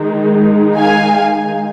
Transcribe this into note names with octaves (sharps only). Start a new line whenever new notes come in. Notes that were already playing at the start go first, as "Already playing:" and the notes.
Already playing: D#3 G#3 D#4
F5 G#5